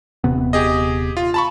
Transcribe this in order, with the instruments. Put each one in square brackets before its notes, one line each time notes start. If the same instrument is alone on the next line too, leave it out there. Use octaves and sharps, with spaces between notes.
[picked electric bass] D#1 C3 B3
[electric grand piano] G4 G#4 D#5
F4
A5 B5 C#6